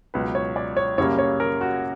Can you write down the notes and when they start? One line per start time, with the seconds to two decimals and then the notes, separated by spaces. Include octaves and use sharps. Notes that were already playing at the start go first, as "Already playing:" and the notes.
0.14 C#2 B2 F#3 B4
0.35 C#5
0.56 D5
0.77 C#5
0.98 F#2 C#3 G3 A#3 C#4 C#5
1.18 C#5
1.40 A#4
1.61 F#4